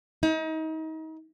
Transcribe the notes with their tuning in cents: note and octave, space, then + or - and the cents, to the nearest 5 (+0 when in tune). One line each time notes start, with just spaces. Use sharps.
D#4 +35